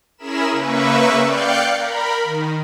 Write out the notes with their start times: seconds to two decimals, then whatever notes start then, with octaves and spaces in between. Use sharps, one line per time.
0.18 C#4 E4 G#4 A#4 B5 E7
0.52 C#3 A#3 B4 E5 C#6
1.18 D5 F5 G5 F#6 G6 C#7
1.74 A#4 B5
2.23 D#3